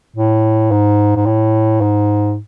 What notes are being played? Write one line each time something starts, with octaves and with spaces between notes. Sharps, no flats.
A2
G#2
G#2
A2
G#2